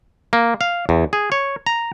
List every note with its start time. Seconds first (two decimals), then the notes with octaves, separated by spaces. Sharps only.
0.33 A#3
0.61 F5
0.89 E2
1.13 G#4
1.32 C#5
1.67 A#5